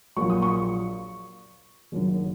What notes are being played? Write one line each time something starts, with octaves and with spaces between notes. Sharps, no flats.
A#1 A#2 F#3 C#6
D#6
C#6
F#1 F#2 D#3 F#3